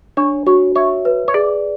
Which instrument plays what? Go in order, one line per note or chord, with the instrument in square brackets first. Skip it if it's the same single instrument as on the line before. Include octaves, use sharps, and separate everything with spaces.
[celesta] D4 [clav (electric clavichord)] C#5
[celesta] F#4 [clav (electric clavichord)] C#5
[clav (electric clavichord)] C#5 [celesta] E5
[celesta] B4
[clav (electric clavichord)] C#5
[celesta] G#4 [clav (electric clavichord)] D5